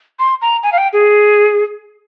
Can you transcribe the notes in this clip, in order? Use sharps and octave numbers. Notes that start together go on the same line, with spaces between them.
C6
A#5
G#5
F5
G5
G#4